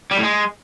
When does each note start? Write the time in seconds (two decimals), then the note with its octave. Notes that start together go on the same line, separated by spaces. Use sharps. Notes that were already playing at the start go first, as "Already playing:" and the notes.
0.11 G3
0.17 A2
0.23 G#3